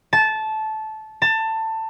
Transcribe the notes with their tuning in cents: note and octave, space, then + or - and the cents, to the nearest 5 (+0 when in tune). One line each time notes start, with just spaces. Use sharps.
A5 -15
A5 +20